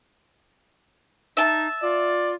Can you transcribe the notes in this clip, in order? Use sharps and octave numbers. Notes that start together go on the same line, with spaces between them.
D#4 E5 A5
F4 D5